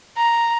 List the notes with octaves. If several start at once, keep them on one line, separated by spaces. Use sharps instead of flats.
A#5